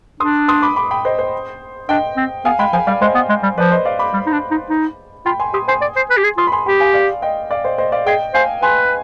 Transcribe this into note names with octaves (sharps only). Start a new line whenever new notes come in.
D4 C6 D#6
C6 D#6
B5 D6
B5 D6
G5 B5
C5 D#5
C5
D4 D#5 G5
C4
B3 F5 G#5
G#3 G5 B5
F3 F5 G#5
G3 D5 F5
G#3 C5 D#5
B3
G#3
G3
F3 B4 D5
C5 D#5
D5 F5
B5 D6
G3
D#4
D4
D#4
D#4
F4 G5 B5
G#5 C6
G4 C6 D#6
C5 G#5 C6
D5
C5
B4
G4
G#4
F4 C6 D#6
B5
G#5 C6
G4 G5 B5
F5 G#5
D5 F5
D#5 G5
D5 F5
C5 D#5
C5 D#5
D5 F5
G#4 D#5 G5
C5 F5 G#5
B4 G#5 C6